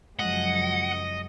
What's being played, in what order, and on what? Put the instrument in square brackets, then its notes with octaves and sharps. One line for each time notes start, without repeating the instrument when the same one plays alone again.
[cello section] F#2 C#3 G#3 [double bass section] F3 F#3 [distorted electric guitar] D#5 [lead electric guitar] F#5